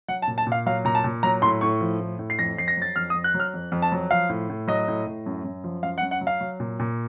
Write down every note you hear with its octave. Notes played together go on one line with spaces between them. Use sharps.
F#3 F#5
A5
A#2
A5
A#2
F5
F#3 F5
A#2 A#5
A5
A#2
F#3 A#5
A2 C6
A2 C#6
F3
A2
A2
C7
F2 A#6
F2 C7
A#6
F#3 A6
F2 F6
D#6
F2
F#6
F#3
F6
F2
F2
A5
F#3
F3 F5
A2
A2
F#3 D#5
A2
A2
F#2
F#2
F3
F#2 F5
F#5
F#2
F#5
F#3
F5
F#3
A#2
A#2